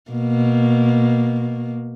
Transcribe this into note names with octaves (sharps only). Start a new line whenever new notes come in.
B2 A#3